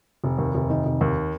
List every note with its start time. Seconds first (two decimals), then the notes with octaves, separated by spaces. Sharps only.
0.24 F1
0.38 D#2
0.54 F1
0.70 D#3
0.86 F1
1.01 D#2